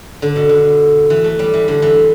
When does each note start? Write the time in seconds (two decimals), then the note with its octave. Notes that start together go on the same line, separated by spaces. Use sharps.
0.22 D3
0.36 B2
0.49 D3
1.10 E3
1.24 A3
1.39 G3
1.54 E3
1.68 D3
1.82 E3